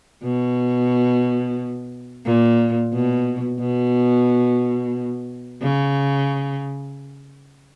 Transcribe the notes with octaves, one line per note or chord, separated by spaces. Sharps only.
B2
A#2
B2
B2
C#3